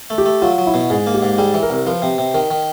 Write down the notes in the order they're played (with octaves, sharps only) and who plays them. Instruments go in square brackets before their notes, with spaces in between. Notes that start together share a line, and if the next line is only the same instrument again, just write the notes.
[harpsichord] A3
[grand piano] G4
[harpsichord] A3
[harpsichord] F#3 [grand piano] F4
[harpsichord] F#3
[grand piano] E4
[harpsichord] B2
[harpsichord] G#2 [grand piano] G#4
[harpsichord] A#3
[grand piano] G4
[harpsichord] G#2
[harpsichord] G3 [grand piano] G#4
[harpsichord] E3
[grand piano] A#4
[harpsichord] C2
[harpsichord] F3 [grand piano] B4
[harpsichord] C3
C3
[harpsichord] D#3 [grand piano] A#4
[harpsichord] D#3